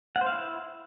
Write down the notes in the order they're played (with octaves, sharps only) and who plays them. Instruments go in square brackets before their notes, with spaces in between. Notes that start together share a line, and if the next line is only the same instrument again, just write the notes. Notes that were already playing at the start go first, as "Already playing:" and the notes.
[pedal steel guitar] F#5
C5
F5
E4